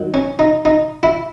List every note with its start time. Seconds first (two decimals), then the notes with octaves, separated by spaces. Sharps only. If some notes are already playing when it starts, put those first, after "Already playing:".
Already playing: D#3 F#3
0.14 C#4
0.39 D#4
0.65 D#4
1.03 E4